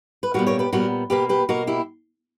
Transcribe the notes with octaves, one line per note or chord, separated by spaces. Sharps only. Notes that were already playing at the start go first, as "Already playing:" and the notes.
B4
A#2 G3 B3 F#4 A#4
A#4 C#5
G4 B4
A#2 G3 B3 F#4 A#4
B2 A#3 G4 B4
G4 B4
B2 A#3 F#4 A#4
E4 G4